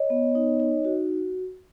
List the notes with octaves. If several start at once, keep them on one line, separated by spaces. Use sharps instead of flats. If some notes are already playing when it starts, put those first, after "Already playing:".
Already playing: C#5 D#5
B3
D#4
D#4
F#4